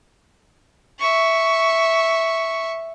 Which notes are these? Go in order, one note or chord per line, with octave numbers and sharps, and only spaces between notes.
E5 C#6